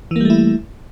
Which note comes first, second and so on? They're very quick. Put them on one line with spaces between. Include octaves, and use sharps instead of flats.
E3 A#3 G3 A3 E4